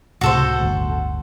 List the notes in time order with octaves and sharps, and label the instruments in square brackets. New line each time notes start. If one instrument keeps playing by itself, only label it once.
[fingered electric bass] C#2 A2 C3 [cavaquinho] F#4 A4 C5
[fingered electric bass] G1 D2 A2